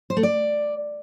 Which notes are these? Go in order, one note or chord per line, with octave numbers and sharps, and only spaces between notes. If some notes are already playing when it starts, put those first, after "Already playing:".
C5
A3
D5